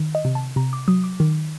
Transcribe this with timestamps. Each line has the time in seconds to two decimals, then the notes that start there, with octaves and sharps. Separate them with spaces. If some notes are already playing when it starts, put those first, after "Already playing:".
Already playing: D#3
0.15 D#5
0.25 C3
0.35 A5
0.56 C3 A#5
0.73 D6
0.88 F#3 D#6
1.04 D6
1.20 D#3